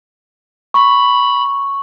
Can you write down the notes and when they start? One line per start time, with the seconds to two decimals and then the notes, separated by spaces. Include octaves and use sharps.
0.74 B5 C#6